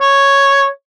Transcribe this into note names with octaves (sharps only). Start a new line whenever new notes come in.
C#5